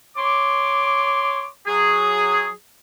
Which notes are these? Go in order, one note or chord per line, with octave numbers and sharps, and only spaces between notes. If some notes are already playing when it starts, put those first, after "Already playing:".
C#5 C6 D6
F#3 G#4